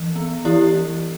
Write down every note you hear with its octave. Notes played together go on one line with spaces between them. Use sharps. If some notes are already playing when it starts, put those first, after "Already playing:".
Already playing: E3
B3
E3 E4 G4
E3